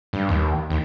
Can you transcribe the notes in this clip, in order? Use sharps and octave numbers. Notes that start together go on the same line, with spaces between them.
G2
D#2
D#2